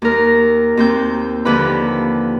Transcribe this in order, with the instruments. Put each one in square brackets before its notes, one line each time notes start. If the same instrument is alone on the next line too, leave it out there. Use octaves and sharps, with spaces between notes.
[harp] D#2 A#4
D#2 C4 G6
D#2 D3 F3 G4 B4 B5